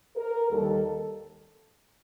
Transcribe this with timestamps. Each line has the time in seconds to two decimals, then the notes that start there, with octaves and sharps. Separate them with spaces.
0.17 A#4
0.51 D#2 D#3 G3 A4